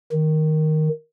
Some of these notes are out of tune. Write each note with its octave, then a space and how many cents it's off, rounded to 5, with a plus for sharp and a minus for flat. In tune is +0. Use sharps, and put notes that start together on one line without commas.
D#3 +0